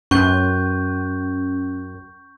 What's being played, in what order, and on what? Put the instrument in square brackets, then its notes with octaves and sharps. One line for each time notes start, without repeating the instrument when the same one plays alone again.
[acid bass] F#2 [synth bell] C#4 [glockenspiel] C#6 G6